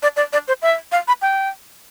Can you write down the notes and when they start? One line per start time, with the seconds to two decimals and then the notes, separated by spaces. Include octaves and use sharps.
0.03 D5
0.17 D5
0.33 D5
0.48 C5
0.62 E5
0.92 F5
1.08 B5
1.22 G5